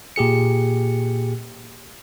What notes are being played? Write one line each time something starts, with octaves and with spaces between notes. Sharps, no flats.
A#2 G4 G#4 C#7